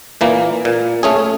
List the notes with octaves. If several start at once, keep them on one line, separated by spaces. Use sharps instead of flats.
A#2 E3 A#3
A#2
A3 C#4 G#4